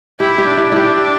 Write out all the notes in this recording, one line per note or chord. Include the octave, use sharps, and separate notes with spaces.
E4 G4
G4
D4
E4
E4 G4